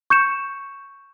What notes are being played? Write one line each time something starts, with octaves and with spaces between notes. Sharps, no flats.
C#6 G6 C#7 E7